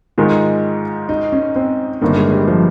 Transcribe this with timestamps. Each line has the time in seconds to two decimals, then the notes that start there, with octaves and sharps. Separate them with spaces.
0.18 G#2 D#3 G#3 F4
1.09 D#4
1.32 C#4
1.56 C4
2.01 G1 G2 D#3 A#3
2.17 G#3
2.32 G3
2.48 F3